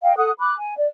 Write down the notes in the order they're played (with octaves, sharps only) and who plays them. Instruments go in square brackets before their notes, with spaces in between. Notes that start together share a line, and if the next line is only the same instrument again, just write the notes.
[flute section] D#5 F5 G5
A4 F#5 D#6 F#6
B5 D6 F#6
G#5
D5